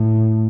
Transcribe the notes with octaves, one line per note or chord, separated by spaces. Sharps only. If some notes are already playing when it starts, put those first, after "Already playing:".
Already playing: A2